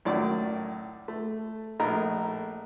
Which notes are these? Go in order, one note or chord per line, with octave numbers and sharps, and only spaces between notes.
F#2 A2 D#3 D5 D6
A3
A#1 A3 D#4 A#4 A#5